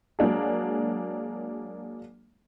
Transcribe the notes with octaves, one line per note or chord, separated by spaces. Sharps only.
F#3 G#3 A#3 D4 G#4